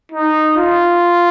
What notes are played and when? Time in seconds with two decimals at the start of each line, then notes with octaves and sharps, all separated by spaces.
0.12 D#4
0.57 F4